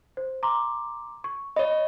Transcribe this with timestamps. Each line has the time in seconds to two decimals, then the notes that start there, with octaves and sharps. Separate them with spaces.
0.17 C5
0.43 A#5 C6 D6
1.24 C#6
1.56 C#5 D#5 B5